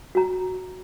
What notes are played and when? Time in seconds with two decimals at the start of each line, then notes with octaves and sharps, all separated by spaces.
0.15 F#4 A#5